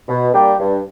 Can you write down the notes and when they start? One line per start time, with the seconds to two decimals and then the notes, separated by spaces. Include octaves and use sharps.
0.09 B2
0.33 G3 A#3 D4 G4
0.59 G2